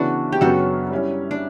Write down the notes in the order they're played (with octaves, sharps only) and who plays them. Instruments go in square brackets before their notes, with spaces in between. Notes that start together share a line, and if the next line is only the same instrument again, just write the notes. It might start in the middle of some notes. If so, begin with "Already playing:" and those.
Already playing: [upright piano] C#3 E3 B3 E4 B4 [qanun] D4 F#4
[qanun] G4
[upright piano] F#2 C#3 F#3 B3 [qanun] F#4 A4
[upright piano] G3 C#4 E4
[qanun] D4